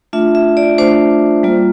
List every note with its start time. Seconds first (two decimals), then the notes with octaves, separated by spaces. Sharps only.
0.13 A3 D4 F4 E5
0.35 E5
0.57 D5
0.78 A3 D4 F4 C5
1.43 G3 A#3 F4